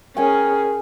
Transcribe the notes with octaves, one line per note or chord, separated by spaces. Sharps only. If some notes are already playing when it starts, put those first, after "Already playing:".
C#4 G#4 A#4 G5 G#5